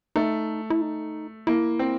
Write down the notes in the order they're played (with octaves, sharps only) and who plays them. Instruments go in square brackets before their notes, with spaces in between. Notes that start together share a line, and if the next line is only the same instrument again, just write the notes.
[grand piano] A3 [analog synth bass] D#4
[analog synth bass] E4
D#4
[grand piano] A#3 [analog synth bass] E4
[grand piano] C4